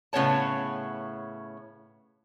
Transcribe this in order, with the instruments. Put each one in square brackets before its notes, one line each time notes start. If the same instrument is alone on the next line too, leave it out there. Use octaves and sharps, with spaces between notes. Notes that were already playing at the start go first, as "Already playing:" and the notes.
[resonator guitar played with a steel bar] A2 C#3 B3 C#5 A5